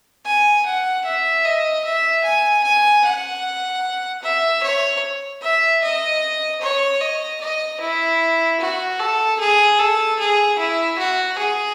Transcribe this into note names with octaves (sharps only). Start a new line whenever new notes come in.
G#5
F#5
E5
D#5
E5
G#5
G#5
F#5
E5
C#5
E5
D#5
C#5
D#5
D#5
E4
F#4
A4
G#4
A4
G#4
E4
F#4
G#4